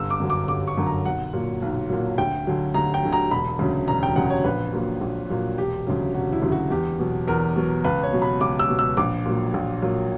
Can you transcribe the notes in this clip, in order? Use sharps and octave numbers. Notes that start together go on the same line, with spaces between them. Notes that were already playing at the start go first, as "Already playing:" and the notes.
Already playing: G1 E6
D6
F#2 D3 F#3
D6
G1 D6
C#6
F#2 D3 F#3
A#5
B1 F#5
A#2 F#3
B1
A#2 F#3
D2 G5
D3 F#3
D2 A#5
G5
D3 F#3
A#5
E1 B5
D2 C#3 F#3
E1 A#5
G5
D2 C#3 F#3 F#5
C#5
A#1 B4
A#2 F#3
A#1
A#2 F#3
E1 G4
D2 C#3 F#3
E1 F#4
E4
D2 C#3 F#3
F#4
E2 G4
B2 F#3
E2 A#4
B2 F#3
C#2 B4
C#5
B2 F#3
B5
C#2 D6
E6
B2 F#3
E6
A#1 D6
A#2 F#3
A#1
A#2 F#3